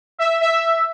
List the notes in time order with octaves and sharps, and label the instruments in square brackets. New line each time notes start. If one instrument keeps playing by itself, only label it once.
[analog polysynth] E5
E5